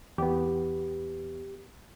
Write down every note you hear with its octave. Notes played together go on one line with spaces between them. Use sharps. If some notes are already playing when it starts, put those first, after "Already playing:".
E2 B3 G4